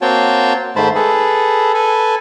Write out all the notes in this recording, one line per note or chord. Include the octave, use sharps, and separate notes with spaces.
A#3 C4 F#4 C#5 G5 A5
G#2 D#3 A3 C5 A5 B5
G#4 A4 B4
A4 B4 G#5